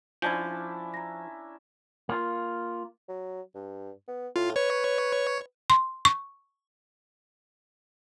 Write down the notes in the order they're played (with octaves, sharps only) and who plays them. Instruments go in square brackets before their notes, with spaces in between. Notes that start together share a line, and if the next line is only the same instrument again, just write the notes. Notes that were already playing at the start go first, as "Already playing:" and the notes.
[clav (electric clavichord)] F3 [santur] C#4 D4 E4 [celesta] G6 G#6
[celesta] A#5 A#6
[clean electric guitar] A#3 F4
[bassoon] F#3
G2
B3
[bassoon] A2 [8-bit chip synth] F4
[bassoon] B4 [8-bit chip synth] C#5
[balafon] C6
C#6